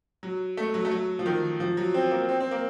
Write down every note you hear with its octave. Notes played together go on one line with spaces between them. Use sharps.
F#3
A3
F#3
A3
F#3
F3
D#3
F3
F#3
C4
A#3
C4
C4
A#3